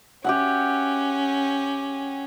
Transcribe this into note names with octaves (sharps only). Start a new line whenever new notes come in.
C#4 G4 E5 F#5